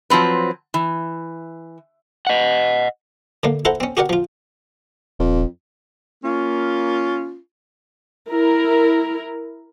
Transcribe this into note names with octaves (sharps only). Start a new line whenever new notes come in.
F3 F#3 C4 B4
E3
D#5 F#5
D3 A3 A#3
E4 A4 C5 F#5 A#5
C4 C#4
F#4 G4 A#4 D5 F#5
F3 F4
D#1 F2
A#3 C#4 F4
E4 A#4